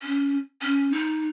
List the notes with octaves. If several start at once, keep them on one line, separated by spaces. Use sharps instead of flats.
C#4
C#4
D#4